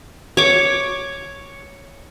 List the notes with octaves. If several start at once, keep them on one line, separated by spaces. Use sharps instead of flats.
C#5 D6